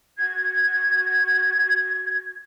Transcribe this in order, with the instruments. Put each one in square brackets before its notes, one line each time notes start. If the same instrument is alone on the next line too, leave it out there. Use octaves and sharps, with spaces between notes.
[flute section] F#4 G#6